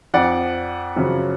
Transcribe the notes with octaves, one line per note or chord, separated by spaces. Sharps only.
F2 F3 D5 F#5
F#2 C#3 F3